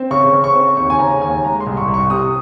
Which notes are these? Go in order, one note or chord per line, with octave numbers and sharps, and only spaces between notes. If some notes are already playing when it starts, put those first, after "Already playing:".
Already playing: C4
C#3 C#6
C#3
C#6
C4
D#2 C#6
G#5
C#3 A#5
D#2 G#5
G#3 A#5
C6
C2
C#6
C2
C#6
C3 D#6